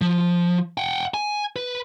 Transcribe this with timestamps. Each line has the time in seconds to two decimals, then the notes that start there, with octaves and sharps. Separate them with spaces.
0.01 F3
0.78 F#5 G5
1.14 G#5
1.56 B4